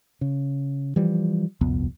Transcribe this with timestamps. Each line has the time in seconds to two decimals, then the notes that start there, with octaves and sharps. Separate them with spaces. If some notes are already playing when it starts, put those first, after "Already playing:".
0.21 C#3
0.96 E3 F3 G3
1.61 D#1 C2 F2 B3